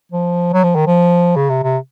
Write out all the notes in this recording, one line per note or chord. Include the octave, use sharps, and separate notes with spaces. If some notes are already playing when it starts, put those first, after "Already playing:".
F3
F#3
F3
D#3
F3
C#3
C3
C3